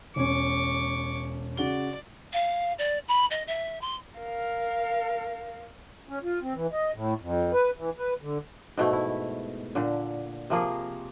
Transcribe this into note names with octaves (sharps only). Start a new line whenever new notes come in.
E1 C#4 C#6 D6
C#3 F#4 D5 G7
F5
D5
B5
D#5
E5
C6
A#4 F5
C#4
F4
C4
E3
D#5
A2
F2
B4
E3
B4
D3
G#2 B2 A3
E4
A#2 D3
C3 F3 A#3 G#4